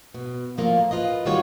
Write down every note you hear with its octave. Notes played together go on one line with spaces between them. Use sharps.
B2
A#2 F3 A3 A#3
F4 B4 D#5
D#3 G3 F4 F#4 C#5